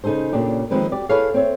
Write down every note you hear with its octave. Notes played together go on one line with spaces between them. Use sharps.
C#3 D#4 G#4 A4 C5
A#2 C#3 D4 G4
D#3 F3 G#3 C4 B4
F#4 G4 D5
E4 G#4 A4 B4 C#5 F5
C4 C#5 E5